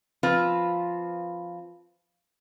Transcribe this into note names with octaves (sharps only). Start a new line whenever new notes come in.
F3 C4 F4 B4